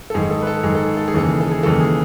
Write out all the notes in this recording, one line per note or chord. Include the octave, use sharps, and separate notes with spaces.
A4
G#2 D#3 G#4
A4
B4
A4
G#2 D#3 G#4
A4
G#4
A4
G#4
D#2 C#3 E3 A4
G#4
A4
G#4
D#2 C#3 E3 A4
G#4